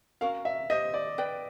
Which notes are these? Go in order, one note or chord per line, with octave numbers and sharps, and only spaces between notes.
C#4 F#4 A#4 F5
E5
G4 C5 D#5 E5
D5
B4 D5 G5